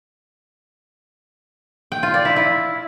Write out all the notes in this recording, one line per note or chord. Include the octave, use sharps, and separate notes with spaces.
G5
F4
D5
E4
E4